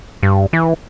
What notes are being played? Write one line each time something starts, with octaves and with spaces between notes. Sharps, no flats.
G2
E3